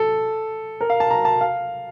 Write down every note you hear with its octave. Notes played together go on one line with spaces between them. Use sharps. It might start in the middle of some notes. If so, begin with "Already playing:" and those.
Already playing: A4
A#4
F5
A5
A#5
A5
F5